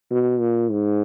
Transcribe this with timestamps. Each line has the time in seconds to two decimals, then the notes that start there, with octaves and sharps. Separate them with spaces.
0.10 B2
0.40 A#2
0.71 G#2